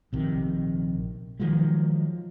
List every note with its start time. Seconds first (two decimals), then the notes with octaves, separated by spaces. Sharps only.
0.13 A#1 C3 D#3
1.40 D#3 F3 F#3 G#3